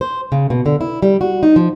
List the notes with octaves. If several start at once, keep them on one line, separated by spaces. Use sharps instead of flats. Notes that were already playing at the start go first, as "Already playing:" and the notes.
C5
C#3
B2
D3
E4
G3
F#4
D#4
F3